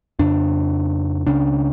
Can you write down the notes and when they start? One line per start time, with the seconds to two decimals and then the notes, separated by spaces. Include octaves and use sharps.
0.19 F2 C#3 D4
1.26 C#2 C#3 D4